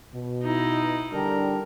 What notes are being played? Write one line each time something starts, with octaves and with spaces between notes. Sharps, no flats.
B2
D#4 E4
D3 G3 D4 A#4